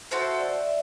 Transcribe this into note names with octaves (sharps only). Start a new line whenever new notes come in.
F#4 A4 C5 E5
D5
E5